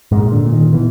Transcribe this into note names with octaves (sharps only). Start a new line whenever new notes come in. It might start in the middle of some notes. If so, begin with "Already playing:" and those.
G#2 G#3
A#2
D3
A#2
D#3
B2 E3